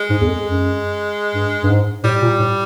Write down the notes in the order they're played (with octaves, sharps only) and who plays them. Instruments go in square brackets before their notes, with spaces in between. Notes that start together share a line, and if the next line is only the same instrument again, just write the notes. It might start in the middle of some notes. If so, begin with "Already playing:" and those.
Already playing: [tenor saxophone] G#3
[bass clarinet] G#2
E2
F2
F#2
G2
G2
G#2
[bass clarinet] A2 [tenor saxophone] G3
[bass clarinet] A#2
A2